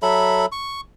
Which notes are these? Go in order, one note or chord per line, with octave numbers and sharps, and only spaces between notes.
F#3 A4 E5 B5
C#6